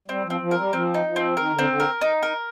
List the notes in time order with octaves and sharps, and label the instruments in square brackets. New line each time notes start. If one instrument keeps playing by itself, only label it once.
[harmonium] G3 [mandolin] C4
[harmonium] F3
[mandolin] C4
[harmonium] F3
[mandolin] A#4
[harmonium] G3
[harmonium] F3 [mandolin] C4
[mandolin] D#4
[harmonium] F3
[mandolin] C4
[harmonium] D#3 [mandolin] A#4
[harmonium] D3
[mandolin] C4
[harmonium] D3
[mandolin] A#4
D#4
A#4